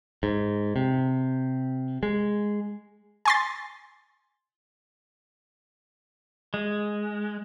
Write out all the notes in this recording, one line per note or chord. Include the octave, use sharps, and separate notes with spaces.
G#2
C3
G#3
G#5 C6 A6
G#3